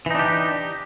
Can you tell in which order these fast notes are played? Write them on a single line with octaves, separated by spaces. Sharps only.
E3 D#4 D4 G4